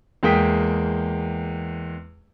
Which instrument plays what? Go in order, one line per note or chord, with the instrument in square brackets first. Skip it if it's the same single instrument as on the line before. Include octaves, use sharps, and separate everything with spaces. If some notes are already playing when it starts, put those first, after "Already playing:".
[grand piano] E2 G#3 A#3 G5 D#6 B6